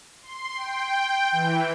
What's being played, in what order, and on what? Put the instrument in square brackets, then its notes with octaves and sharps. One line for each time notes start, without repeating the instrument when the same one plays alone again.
[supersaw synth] C6
G5
E3